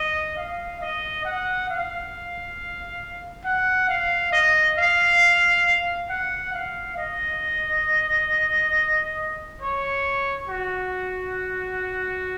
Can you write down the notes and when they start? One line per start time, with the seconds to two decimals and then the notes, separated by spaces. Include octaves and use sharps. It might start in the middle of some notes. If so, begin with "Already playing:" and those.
Already playing: D#5
0.37 F5
0.81 D#5
1.25 F#5
1.69 F5
3.44 F#5
3.88 F5
4.32 D#5
4.77 F5
6.09 F#5
6.53 F5
6.97 D#5
9.61 C#5
10.49 F#4